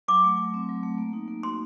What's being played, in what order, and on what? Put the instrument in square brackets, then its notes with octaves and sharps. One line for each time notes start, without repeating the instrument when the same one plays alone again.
[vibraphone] F#3 [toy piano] D6
[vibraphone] A3
F#3
C4
F#3
A3
A#3
D#4
A#3
[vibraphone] F#4 [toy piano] C6